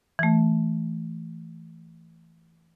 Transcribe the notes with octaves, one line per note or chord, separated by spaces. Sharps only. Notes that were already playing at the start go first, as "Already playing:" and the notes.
E3 A3